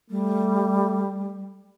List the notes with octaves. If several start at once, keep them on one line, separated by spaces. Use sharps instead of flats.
G3 A3